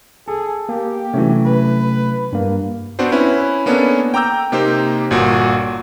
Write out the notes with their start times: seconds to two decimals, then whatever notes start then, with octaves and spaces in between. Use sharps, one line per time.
0.28 G#4 A4
0.69 A#3 G4
1.13 C3 E3 F#3 A3 C#4
1.46 B4
2.32 G2 A#3
2.99 B3 C4 D4 F#4 C5
3.12 C#4 E4 B4
3.66 A#3 B3 C#4 D4 A4
4.14 G5 A#5 D6 E6 G6
4.52 C3 A#3 D#4 G4 C5
5.11 G1 A#2 F#4